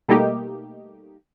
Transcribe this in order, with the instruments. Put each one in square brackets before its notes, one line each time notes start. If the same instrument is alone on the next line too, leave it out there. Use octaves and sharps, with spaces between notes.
[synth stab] B2 G3 A3 A#3 D#4 G4